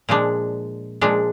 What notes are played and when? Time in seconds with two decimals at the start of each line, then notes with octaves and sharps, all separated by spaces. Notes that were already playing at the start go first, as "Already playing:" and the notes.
0.09 A#2 F3 G#3 D4
1.01 A#2 F3 G#3 D4